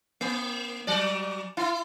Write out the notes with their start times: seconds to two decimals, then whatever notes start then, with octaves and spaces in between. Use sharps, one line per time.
0.21 A#3
0.87 F#3 D5
1.57 E4